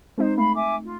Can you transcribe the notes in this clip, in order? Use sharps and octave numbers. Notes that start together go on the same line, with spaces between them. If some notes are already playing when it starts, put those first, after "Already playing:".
G#3 C4 D#4 C5
A3 F5 B5
E5 G#5 D6
F4